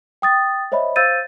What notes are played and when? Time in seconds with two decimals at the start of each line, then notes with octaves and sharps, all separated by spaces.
0.22 G5 D#6 A6
0.72 C5 C#5 D#5 E5 B5
0.96 C5 F5 E6 G6 A6 D#7